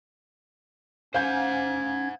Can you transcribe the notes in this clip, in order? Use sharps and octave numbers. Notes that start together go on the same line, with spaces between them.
C#4 C5 F5 F#5 G#5 G6 G#6